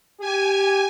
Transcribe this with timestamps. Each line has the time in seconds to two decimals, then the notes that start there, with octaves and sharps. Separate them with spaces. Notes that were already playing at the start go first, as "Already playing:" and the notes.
0.21 G4 G#5